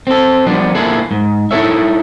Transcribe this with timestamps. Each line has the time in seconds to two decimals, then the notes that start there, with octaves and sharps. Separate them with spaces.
0.07 C4 A4
0.47 F3 G3 B3 D4
0.75 A#3 E4 F4 G#4 A4
1.11 G#2
1.51 D#4 E4 F#4 A4 C#5 E5